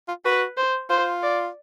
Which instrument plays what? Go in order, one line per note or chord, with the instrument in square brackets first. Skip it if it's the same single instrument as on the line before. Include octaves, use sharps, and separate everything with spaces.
[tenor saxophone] F4
[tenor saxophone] F#4 [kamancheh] B4
[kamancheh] C5
[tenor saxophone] F4 [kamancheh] C5
[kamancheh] D5